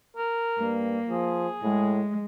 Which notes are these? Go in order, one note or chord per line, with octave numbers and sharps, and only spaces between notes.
A#4
G2 A#3
F3 G#4
A2 G#3